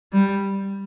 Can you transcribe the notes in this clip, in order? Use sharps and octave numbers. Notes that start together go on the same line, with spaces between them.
G3